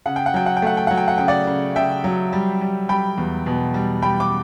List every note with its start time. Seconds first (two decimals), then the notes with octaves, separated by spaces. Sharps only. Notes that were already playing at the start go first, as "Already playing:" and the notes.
0.06 C#3 F#5
0.16 G5
0.26 F#5
0.34 F#3 G5
0.46 F#5
0.57 G5
0.62 A3 F#5
0.77 G5
0.87 F#3 F#5
0.97 G5
1.08 F#5
1.18 C#3 G5
1.28 D5 F#5
1.47 C#3
1.76 C#3 E5 G5
2.04 F#3
2.33 G3
2.61 G3
2.89 G3 G5 B5
3.18 E2
3.46 B2
3.74 G3
4.02 G3 G5 B5
4.20 D6